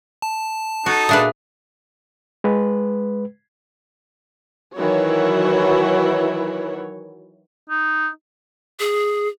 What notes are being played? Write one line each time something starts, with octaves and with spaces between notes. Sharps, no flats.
A5
D#4 F#4 A4
A#2 D4 G#4 B4 E5 D#6
G#3 B4
D#3 E3 F#3 E4 F#4 C#5
D#4
G#4